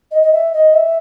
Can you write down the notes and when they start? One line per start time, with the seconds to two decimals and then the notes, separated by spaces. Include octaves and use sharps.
0.11 D#5
0.22 D#5
0.32 E5
0.52 D#5
0.73 E5